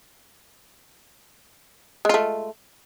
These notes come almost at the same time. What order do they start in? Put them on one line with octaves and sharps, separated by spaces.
G#3 F4 A3